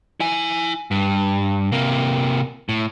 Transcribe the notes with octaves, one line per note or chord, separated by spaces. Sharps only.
E4 G#5
G2
C3 A#3
A2